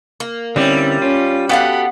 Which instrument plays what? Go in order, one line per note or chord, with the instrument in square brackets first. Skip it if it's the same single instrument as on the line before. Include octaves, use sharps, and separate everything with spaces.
[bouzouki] A#3
[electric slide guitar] D3 C4 E4 [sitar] G3 [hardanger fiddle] C#4
[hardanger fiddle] C#4 [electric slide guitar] F4
[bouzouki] B3 F5 F#5 [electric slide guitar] F#4 G4 A4 [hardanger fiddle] B5